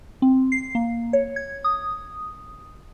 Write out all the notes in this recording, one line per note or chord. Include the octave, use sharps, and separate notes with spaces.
C4
C7
A#3
C#5
G#6
D#6